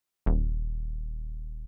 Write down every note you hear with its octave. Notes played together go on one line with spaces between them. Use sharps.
D#1